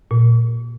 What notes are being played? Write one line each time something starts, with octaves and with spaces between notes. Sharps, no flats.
A#2